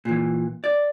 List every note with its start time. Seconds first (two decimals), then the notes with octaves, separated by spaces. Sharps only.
0.05 A#2 E3
0.64 D5